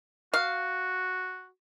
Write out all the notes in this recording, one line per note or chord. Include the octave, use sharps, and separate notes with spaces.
F#4 F5